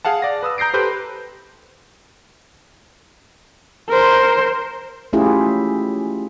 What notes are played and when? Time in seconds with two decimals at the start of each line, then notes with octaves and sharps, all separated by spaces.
0.05 G#4 F5 F#5 A5
0.22 D5 A#6
0.43 B4 D#6 E6
0.58 A#5 G6 A#6 C7 D7
0.74 G4 A4 B4 C5 F#6 G6
3.89 A#4 C5
5.13 A3 C#4 E4 F4 G4 G#4